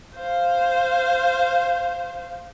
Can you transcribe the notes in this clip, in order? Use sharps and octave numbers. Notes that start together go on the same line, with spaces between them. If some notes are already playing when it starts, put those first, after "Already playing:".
C5 F5